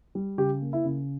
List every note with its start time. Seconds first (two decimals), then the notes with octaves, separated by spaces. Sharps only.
0.15 G3
0.38 C#3 G4
0.62 A#3
0.73 E4
0.85 C#3